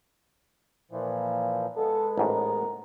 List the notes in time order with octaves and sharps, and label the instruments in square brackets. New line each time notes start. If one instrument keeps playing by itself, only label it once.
[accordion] A#2 E3 F3
[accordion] G#3 B3 [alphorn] A4
[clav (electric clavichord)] A1 G#2 [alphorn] A#4